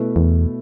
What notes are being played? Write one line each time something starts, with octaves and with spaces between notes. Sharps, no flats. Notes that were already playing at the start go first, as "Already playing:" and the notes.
Already playing: B2 A3 E4 B4
E2